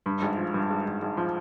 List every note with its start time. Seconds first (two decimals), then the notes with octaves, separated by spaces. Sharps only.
0.06 G2
0.22 G#1
0.37 F3
0.54 G2
0.70 G#1
0.85 G#1
1.02 G#1
1.17 F3